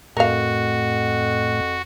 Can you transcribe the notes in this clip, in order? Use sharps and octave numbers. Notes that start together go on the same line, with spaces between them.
F2 A2 F#4 A#4 F5